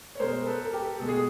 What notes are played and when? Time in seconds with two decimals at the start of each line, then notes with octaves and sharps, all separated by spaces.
0.15 C#5
0.20 B2 G#3 A#4 C5
0.46 A4 B4
0.65 A#4
0.73 G4 A4
1.00 B2 G#3 A4
1.08 G#4